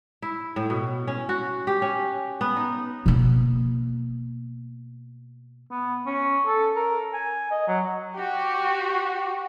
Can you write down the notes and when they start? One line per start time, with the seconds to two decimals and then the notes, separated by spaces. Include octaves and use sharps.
0.22 E4
0.56 A2
0.70 B2
1.07 C#4
1.29 F#4
1.67 G4
1.82 C#4
2.41 B3
2.57 D#4
3.06 B2 A#3
5.71 B3
6.06 C#4
6.46 A4
6.76 A#4
7.13 G#5
7.51 D#5
7.68 F#3
8.15 F#4 G4